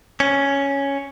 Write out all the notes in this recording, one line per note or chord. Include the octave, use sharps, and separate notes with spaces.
C#4